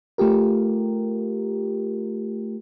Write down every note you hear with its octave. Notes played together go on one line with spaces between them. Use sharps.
A3 F4 G4 A#4